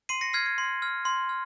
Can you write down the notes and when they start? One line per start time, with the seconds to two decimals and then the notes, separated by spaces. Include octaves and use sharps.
0.09 C6 C7 D#7
0.21 A#6 C#7
0.33 F6 G#6 C7
0.46 G#6
0.58 C6
0.82 F6
1.05 C6
1.29 F6